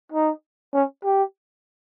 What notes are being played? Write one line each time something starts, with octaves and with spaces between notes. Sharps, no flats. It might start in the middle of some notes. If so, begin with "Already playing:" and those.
D#4
C#4
G4